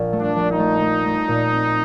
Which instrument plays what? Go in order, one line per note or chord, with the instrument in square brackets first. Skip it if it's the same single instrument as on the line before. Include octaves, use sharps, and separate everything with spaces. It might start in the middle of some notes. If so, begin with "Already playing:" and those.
Already playing: [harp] A#1 A#2
A3
[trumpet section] D4
[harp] A#1
[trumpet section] D#4
[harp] A3
A3
A3
A#2
C4